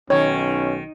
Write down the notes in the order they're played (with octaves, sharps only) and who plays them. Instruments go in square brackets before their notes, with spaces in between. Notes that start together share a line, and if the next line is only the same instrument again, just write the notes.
[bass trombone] B1 [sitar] D#3 [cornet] C#4 [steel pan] C#5